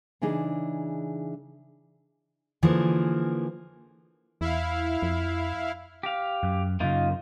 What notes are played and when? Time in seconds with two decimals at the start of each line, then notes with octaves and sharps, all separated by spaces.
0.21 C#3 E3 D4 D#4 G#4
2.63 D3 E3 F3 A#3 G#4
4.41 E2 E4 F5
5.02 F2
6.03 G4 F5
6.43 F#2
6.80 F#2 C#3 A#3 D#4 F4